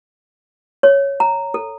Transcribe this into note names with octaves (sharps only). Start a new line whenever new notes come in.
C#5
A#5
A4